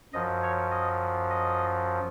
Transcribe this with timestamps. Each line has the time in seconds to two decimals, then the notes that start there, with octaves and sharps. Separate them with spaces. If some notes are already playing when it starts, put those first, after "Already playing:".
0.13 F#2 F3 D#5
0.43 C#5
0.71 D#5
1.30 D#5